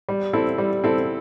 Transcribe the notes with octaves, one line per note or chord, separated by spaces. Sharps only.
G3
C4 E4 A4
G3
C4 E4 A4